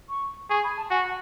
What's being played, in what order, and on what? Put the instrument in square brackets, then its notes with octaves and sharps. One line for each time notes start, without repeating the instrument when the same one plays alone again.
[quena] C#6
[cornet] G#4 [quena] C#6
[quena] B5
A5
[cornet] F#4 [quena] G#5